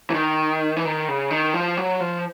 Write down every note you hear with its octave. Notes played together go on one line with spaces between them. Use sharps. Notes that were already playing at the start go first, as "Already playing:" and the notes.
E3
D#3
E3
D#3
C#3
D#3
F3
F#3
F3